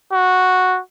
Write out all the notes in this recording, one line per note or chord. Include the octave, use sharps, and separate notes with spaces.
F#4